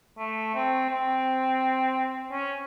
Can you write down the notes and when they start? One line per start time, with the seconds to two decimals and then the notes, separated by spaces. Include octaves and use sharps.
0.18 A3
0.54 C4
0.90 C4
2.32 C#4